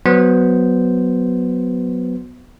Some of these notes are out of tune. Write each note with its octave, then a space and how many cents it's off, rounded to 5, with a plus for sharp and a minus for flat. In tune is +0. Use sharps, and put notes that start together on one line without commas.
F#3 +0 B3 +0 C5 +0